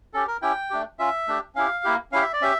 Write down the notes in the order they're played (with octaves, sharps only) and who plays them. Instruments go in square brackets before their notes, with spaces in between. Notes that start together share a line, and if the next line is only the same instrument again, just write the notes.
[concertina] C#4 G4 A4
A#4
C#4 E4 G4 G5
A3 D4 G4
C#4 F4 E5
A3 D4 G4
C#4 E4 G4 F5
A#3 E4 G4
C#4 E4 G4 F5
E5
D5
C#4 G4 E5